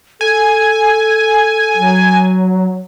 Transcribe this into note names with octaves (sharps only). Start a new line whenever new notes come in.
A4 G#5
F#3